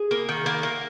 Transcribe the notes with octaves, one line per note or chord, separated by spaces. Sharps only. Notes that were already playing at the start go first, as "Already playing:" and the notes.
Already playing: G#4
A#3
D#3
A#3
A#3